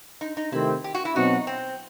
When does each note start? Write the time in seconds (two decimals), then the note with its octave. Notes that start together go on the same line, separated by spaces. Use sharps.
0.21 D#4
0.37 D#4
0.52 C3 D#3 A3 C4 E4
0.84 G4
0.94 F#4
1.05 E4
1.16 B2 F#3 C4 D#4 F#4
1.47 C4